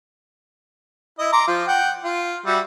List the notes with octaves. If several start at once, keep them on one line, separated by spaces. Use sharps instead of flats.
E4 D#5
A#5 C6 D6
F3 F4
F#5 G5
F4
G3 F#4 E5